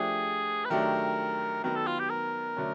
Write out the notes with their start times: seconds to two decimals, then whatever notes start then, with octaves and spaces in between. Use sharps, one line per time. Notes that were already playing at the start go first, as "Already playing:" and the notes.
Already playing: F3 A3 D4 G4 G#4
0.65 B4
0.70 D#3 F#3 A3 D4 G4 A#4
1.64 D#3 F#3 B3 A#4
1.76 A4
1.87 F4
1.99 G4
2.10 A#4
2.57 D3 F#3 A3 C#4